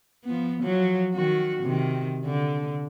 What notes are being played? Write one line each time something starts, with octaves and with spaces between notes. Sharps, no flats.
F3 B3
F3 F#3
D#3 F#4
C3 D#3
D3